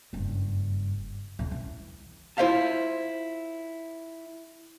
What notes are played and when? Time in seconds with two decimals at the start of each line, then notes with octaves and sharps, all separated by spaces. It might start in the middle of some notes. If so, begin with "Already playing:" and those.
0.13 F#1 G2
1.39 B1 E2
1.51 E3
2.37 E4 F4 C5 E5 F5 A5